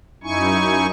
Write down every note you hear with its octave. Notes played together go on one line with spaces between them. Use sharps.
F#2 D#4 E4 G#5 C#6